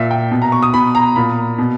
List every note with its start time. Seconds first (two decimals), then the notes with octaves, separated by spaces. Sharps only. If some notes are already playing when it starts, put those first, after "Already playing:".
Already playing: A#2 E5
0.11 G5
0.31 B2
0.42 A#5
0.52 C#6
0.63 D#6
0.74 B2 B5
0.95 A#5
1.16 A#2 B5
1.58 B2